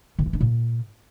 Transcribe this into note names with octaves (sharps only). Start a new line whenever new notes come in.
D#3
E3
D4
A#2